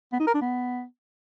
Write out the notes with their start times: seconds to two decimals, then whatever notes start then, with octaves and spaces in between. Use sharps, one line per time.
0.13 B3
0.20 D#4
0.27 A#4
0.34 D4
0.41 B3